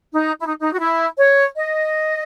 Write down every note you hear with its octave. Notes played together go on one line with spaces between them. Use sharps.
D#4
E4
D#4
D#4
F#4
E4
C#5
D#5